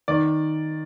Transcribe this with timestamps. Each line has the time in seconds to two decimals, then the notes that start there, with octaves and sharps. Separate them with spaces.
0.08 D#3 D5